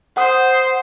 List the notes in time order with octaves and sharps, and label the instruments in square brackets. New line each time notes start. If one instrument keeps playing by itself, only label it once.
[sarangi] C5 [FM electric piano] F#5 D#6